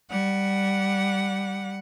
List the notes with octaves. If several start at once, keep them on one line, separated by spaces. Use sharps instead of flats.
G3 F#5